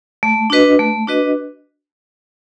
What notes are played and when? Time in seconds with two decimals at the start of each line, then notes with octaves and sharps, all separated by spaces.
0.23 A3
0.50 D4 F#4 B4 D#5
0.79 A3
1.07 D4 F#4 B4 D#5